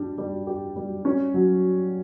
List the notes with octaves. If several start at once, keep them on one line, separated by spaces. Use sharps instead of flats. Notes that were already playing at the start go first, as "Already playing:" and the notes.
Already playing: G3 D4
G3
G4
G3
C#4
F#3